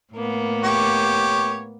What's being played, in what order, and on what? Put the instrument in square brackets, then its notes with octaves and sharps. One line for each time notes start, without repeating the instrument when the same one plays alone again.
[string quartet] A2 A#3 B3
[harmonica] G4 C#5